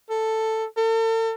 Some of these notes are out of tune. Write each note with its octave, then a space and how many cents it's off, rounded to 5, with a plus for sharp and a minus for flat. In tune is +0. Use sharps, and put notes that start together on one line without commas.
A4 +5
A4 +40